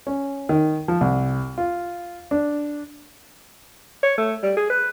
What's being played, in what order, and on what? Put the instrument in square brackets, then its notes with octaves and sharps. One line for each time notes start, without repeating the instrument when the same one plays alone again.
[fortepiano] C#4
D#3
F3
C2
F4
D4
[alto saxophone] C#5
A3
G3
G#4
B4